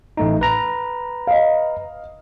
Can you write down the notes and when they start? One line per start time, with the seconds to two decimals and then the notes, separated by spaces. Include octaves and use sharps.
0.17 A1 A3 D#4
0.41 B4 A#5
1.27 D#5 F5